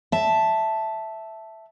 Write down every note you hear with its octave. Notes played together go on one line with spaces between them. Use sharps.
E5 A5